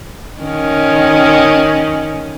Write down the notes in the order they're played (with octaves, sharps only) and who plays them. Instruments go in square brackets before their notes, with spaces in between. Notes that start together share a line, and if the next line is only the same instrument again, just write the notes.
[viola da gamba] D#3 C#4